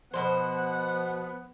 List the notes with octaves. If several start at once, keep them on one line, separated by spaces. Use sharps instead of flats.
B2 E3 F3 B3 C5 F#5